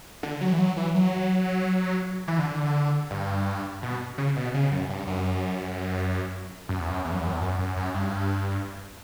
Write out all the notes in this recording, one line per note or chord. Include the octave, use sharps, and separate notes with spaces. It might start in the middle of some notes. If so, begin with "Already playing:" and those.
D3
F#3
E3
F#3
E3
F#3
E3
D3
G2
B2
C#3
B2
C#3
F#2
G2
F#2
F#2
E2
F#2
E2
F#2
E2
F#2
E2
F#2
F#2
F#2
G2